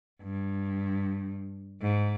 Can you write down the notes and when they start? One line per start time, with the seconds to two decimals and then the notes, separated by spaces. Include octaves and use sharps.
0.22 G2
1.82 G#2